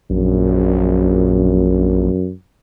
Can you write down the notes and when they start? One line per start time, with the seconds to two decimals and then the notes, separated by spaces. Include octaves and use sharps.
0.10 A#1 F#2